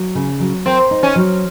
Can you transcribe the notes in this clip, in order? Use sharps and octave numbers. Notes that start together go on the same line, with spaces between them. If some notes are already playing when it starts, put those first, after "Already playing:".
Already playing: F#3
C#3
F#3
C4 A#4
D#4
C#4
F#3